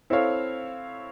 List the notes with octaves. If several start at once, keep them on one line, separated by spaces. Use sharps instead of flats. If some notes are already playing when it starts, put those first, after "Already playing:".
C4 E4 A4 C#5 F5